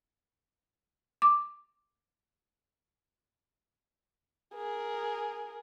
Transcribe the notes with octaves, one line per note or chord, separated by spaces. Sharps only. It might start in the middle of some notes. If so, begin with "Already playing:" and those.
D6
G#4 A#4